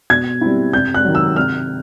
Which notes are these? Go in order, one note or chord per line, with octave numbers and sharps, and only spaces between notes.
B2 G#6
G3 C4 E4
C3 G6
F#6
D#3 F#3
E6
C3 F6